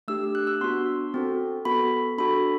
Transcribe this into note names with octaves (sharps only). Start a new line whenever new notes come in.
A3 D4 G4 E6
F#6
E6
B3 D4 F#4 C6
C4 F#4 A4
B3 F#4 A4 B5
D4 F#4 A4 B5